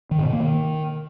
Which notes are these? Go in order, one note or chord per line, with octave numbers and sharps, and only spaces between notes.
D#3
G#2
B2
A#3
D#3